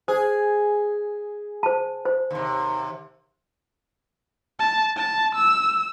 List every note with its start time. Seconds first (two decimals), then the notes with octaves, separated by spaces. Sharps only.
0.08 G#4 C5
1.63 C5 A5
2.05 C5
2.31 D#2 C3
4.59 A5
4.97 A5
5.35 E6